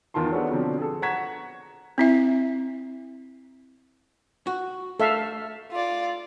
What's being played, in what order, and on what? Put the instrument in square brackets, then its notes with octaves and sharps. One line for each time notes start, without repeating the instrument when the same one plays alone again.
[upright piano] E2 D#3 F4 A5 C6
B3 D4 F#4 G#4 A4 C#5
B2 D3 F3 F#3 C4 D4
G#4 A4
F#5 A#5 C#6 G#6 B6 E7
[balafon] C4 E4 E5
[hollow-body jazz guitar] F#4
[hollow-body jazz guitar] A3 [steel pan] A4 E5 F5
[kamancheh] F4 D5